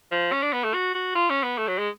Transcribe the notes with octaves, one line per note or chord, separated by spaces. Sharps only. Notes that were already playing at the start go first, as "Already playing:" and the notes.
F3
C#4
D4
B3
A3
F#4
F#4
F4
C#4
B3
A3
F#3
G#3